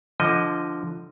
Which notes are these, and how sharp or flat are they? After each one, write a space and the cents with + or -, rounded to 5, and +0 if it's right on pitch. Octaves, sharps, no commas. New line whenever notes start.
D3 +0 F3 -15 D#5 +0